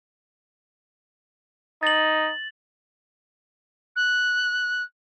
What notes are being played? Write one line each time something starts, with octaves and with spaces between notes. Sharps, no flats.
D#4 A6 F#7
F#6